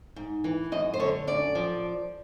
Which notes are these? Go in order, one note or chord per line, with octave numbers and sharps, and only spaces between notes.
G#2
E3
F#2 D#5
C5
D3 C#5
F#2 D5
F3